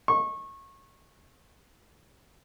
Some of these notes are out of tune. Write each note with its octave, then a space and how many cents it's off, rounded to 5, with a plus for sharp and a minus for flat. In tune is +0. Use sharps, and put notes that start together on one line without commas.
C#6 -25